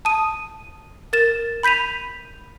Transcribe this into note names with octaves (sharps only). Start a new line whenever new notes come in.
A5 D#6 D#7
A#4 A6 E7
B5 G6 B6 D#7 F7